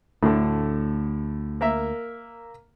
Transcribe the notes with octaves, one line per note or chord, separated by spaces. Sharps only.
D2 A2 D3
A#3 A#4 E5